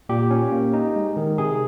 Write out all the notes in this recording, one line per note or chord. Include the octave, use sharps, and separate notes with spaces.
A#2 G4
C#4
A#3
D#4
G#3
D#3
C3 G#4